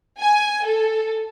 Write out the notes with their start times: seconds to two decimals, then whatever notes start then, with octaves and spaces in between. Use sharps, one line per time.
0.19 G#5
0.66 A4